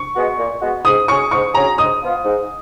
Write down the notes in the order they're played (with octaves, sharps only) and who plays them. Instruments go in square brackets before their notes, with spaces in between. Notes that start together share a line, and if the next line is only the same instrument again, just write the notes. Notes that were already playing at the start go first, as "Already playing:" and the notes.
Already playing: [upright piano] C#6
[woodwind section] G#3 B3 F#4
A#2
G#3 B3 F#4
[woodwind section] G#2 [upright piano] D#6
[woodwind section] F#3 C#4 G#4 [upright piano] C#6
[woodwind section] G#2 [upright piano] C#6
[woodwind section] F#3 C#4 G#4 [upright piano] A#5
[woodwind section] G#2 [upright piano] D#6
[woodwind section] F3 B3 F4
G#2